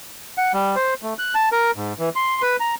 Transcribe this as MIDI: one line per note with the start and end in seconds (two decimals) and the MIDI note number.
0.38 0.52 78
0.54 0.76 55
0.76 0.94 72
1.03 1.14 57
1.19 1.35 90
1.35 1.49 81
1.52 1.71 70
1.76 1.93 44
1.99 2.09 52
2.16 2.42 84
2.42 2.57 71
2.60 2.75 82